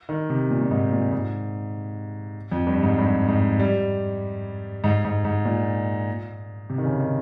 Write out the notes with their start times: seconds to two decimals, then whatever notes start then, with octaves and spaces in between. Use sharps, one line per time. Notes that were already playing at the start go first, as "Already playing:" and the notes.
0.09 D#3
0.30 C3
0.51 A#2
0.61 A#2
0.71 G#2
0.92 A#2
1.12 G#2
2.52 F2
2.67 G2
2.83 G#2
2.98 G2
3.28 G#2
3.60 G3
4.84 G#2
5.05 G#2
5.25 G#2
5.45 A#2
6.70 C3
6.78 D#3
6.85 C#3
7.00 D#3